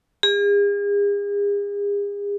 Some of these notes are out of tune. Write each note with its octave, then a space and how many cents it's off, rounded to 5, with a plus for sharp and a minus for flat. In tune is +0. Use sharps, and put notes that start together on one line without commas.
G#4 -40